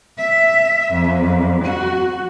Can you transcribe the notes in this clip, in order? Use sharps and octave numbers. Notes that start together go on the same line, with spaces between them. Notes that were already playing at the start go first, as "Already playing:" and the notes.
E5
F2
F#4